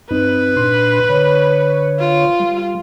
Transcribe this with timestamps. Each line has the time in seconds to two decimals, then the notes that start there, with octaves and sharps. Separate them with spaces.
0.11 G2 C4 D#4 B4
0.57 A#2 D4 C6
1.09 D3 C#5
1.99 F4
2.40 G3